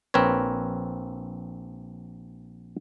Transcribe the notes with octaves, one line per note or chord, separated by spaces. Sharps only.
A#1 C4 A#4 B4 C#5